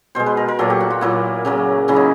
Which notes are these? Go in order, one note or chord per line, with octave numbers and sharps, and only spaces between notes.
B2 G#3 C5
B4
A#4
A#4
A#2 F#3 A#3 A4
G4
F#4
F4
A#2 F#3 A#3 E4
C#3 F#3 A#3
C#3 F#3 A#3 E4
D#4